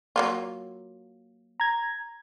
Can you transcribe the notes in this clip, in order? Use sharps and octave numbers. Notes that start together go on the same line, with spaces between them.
F#3 A#3 F4
A#5 G#6